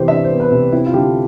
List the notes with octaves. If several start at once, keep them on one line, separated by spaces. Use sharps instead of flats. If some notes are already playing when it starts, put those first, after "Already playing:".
Already playing: C3 E3 B3 G4 C5
D4 E5
C5
B3
B4
C3
C4 E4
F4
D3 G4